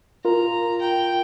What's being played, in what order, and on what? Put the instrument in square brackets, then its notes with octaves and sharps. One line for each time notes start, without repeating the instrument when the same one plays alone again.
[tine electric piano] F4 A#4 [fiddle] A#5
[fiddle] G5